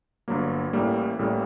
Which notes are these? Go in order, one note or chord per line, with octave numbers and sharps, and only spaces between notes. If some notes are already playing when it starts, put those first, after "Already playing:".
G1 G2 F#3 A#3
A1 A2 G3 A#3
A1 A2 G3 A#3